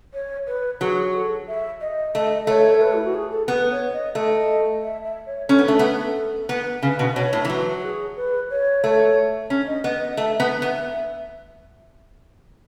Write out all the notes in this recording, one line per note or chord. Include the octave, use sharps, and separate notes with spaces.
C#5
B4
F#3 G#4
A4
E5
D#5
A3 D#5
A3 C#5
A4
B4
E4
F#4
G#4
A4
B3 B4
C#5
D#5
A3 D#5
E5
E5
C#5
C#4 A4
B3
A3
B3
B3
C#3 B4
B2
B4
B2 C#5
A2
E3
F#3 B4
G#4
B4
C#5
A3
C#4
D#5
B3 D#5
D#5
A3 E5
B3
B3